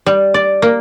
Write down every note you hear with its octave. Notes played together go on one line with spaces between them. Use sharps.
G3
D5
A#3